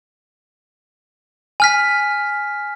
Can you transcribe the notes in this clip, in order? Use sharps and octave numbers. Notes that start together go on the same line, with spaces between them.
G#5 F6 B6